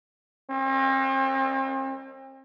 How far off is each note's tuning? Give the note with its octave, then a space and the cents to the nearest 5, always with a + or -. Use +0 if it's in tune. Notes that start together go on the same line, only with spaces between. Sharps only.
C4 +40